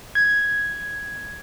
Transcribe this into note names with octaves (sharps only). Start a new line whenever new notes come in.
G#6